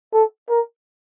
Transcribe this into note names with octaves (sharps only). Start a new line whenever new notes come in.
A4
A#4